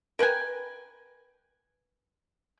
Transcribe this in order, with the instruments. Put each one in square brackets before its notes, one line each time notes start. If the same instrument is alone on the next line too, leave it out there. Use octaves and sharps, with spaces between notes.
[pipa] A#4 B4 G5 G#5